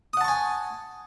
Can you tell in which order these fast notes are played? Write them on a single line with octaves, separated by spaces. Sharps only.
D#6 F#5 A5 C#6 G#5